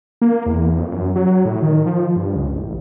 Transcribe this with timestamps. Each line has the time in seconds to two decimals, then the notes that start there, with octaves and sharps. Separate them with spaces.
0.22 A#3
0.46 E2
0.78 F2
0.92 F#2
1.16 F#3
1.45 A2
1.62 D#3
1.86 F3
2.16 G2
2.36 C#2
2.55 A1